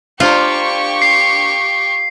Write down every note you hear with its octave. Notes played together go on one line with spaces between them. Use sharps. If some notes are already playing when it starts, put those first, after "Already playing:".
A#3 D4 F4 G4 C5 C#6
C7